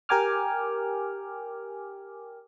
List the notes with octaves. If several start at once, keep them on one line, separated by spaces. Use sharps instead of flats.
G4 A#4 G5 G#5 D6 F6